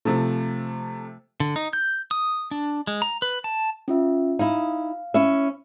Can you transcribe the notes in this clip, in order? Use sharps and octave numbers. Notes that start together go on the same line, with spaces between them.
C3 F3 A3
D3
D#4
G6
D#6
D4
G#3
A#5
B4
A5
C#4 F4 E5
D#4 E4 F5
C#4 E4 E5